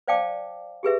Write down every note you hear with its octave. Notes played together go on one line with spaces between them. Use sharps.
C5 D5 F5 G5 A5 D6
G4 G#4 B4 E5